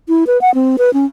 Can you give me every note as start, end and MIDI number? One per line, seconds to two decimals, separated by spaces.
0.09 0.24 64
0.27 0.40 71
0.41 0.53 78
0.54 0.76 60
0.78 0.93 71
0.94 1.05 61